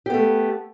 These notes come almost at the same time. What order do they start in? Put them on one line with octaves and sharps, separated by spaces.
G4 B3 A3